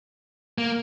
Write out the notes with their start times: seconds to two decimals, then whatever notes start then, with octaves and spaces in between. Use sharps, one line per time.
0.58 A#3